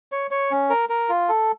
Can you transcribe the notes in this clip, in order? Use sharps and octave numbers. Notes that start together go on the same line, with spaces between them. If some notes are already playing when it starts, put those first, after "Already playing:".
C#5
C#5
C#4
A#4
A#4
F4
A4